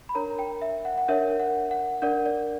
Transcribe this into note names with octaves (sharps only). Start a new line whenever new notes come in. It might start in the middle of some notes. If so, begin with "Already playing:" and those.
B5
D4 A#4 C#5 A#5
G5
E5
F#5
F#5
D4 A#4 C#5 E5
F#5
F#5
D4 A#4 D5 F#5
D5